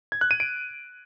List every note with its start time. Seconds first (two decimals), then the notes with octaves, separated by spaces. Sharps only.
0.12 G#6
0.21 F#6
0.31 D#7
0.40 D7